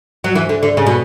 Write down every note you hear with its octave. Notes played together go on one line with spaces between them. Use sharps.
F#3
E3
D3
D3
C#3
B2